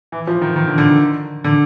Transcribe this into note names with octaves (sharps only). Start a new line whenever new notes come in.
E3
F3
D#3
D#3
D3
D3
D#3
D3